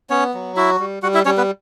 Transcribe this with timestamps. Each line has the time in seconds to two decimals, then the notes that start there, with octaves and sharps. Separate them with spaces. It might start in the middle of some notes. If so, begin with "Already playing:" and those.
0.10 B3 C#4 C#5
0.34 F#3
0.56 E4 F#4 E5
0.79 G3
1.03 G3 F#4 F#5
1.14 E4 E5
1.25 G3 C#4 C#5
1.38 B3 B4